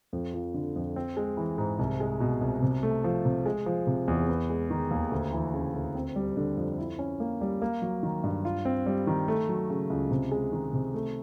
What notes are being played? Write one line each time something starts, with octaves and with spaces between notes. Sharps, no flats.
F2
F3
D3
F2
C4
G#3
E3
G#2
C2
G#3
B2
C2
C3
A3
F3
C3
G#3
F3
C3
E2
B3
G#3
D#3
D#2
D2
E3
C#3
D2
C4
G3
D3
F2
E4
C#4
A#3
G3
A#3
F#3
D#3
G2
F4
C4
G3
D#3
A3
F#3
C#3
C#2
C3
G#3
D#3
C3
A3